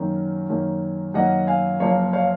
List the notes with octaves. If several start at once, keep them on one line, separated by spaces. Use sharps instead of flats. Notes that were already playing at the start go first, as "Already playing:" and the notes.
Already playing: F#2 D#3 A#3 C#4
F#2 D#3 A#3 C#4
F#2 D#3 A#3 C#4 D#5 F#5
F5 G#5
F#1 F#2 F3 A#3 C#5 F5
C#5 F5